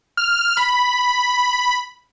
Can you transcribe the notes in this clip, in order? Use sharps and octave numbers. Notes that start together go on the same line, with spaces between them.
F6
B5